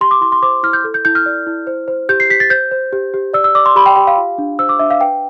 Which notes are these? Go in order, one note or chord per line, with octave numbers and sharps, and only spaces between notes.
G4 C6
D6
E4 C6
C6
C5 D6
E4 F6
G6
A4
G6
E4 G6
F6
D5
E4
C5
C5
G4 G6
C7
G4 B6
A6
C5 G6
C5
G4
G4
D5 E6
E6
D5 D6
C6
G4 B5
G5
G4 G5
F5
F4
D4
C5 E6
D6
D4 E5
F5
B4 G5